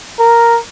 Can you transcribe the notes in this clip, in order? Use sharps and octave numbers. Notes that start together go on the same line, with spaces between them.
A#4